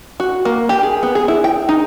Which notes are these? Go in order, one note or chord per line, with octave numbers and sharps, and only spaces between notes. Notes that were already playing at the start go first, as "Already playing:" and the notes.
F#4
A#3
G4
G#4
B3
G#4
E4
G5
D#4